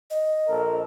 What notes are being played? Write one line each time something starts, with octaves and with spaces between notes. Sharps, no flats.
D#5
A#1 A4 A#4